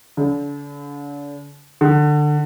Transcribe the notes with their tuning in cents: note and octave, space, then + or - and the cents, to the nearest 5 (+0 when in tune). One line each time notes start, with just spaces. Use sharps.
D3 -40
D3 +20